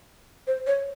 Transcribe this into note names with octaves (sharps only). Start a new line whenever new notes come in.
C5
C#5